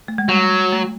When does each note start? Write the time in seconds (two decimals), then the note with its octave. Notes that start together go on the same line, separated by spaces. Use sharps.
0.08 A3
0.18 G#3
0.28 F#3 G3
0.72 A3